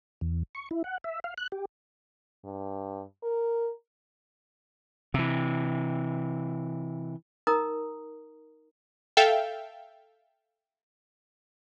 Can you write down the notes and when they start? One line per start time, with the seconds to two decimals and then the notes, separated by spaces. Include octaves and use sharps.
0.21 E2
0.55 C#6
0.71 E4
0.84 F#5
1.04 E5
1.24 F5
1.38 F#6
1.52 G4
2.45 G2
3.23 A#4
5.14 C3 E3
7.47 D#4 A#4 A#5 D#6
9.17 A4 E5 F5 G5